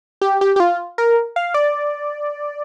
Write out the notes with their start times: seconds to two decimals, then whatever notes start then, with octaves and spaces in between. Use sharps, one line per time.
0.22 G4
0.41 G4
0.56 G4
0.60 F4
0.98 A#4
1.36 F5
1.54 D5